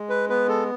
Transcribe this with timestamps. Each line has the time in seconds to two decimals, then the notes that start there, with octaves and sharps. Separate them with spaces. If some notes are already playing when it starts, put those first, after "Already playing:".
Already playing: G#3
0.09 B4
0.29 B3 B4
0.49 A4